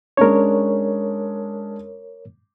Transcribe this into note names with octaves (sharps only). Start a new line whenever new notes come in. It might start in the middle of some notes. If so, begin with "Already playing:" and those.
G#3 C#4 D4 A#4 C#5